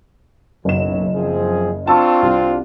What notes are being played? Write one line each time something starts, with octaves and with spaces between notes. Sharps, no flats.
F#1 B1 F#3 E7
F3 C4 G#4
C4 D4 F4 A5 C#6 E6
C2